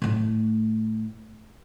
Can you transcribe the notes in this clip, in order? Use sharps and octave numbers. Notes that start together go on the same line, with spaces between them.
A2 A3